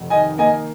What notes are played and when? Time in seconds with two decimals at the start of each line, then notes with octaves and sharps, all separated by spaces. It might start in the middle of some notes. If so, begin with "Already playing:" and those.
Already playing: F1
0.10 D#3 D#5 G#5
0.38 A#3 D#5 G#5